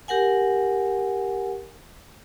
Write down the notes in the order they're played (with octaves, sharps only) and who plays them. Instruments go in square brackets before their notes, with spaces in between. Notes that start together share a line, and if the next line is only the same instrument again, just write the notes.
[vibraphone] G4 A#4 F#5 G#5